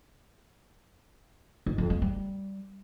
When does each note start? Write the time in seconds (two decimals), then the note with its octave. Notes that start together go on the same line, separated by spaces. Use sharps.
1.66 G#2
1.78 F2
1.90 G#3
2.02 G3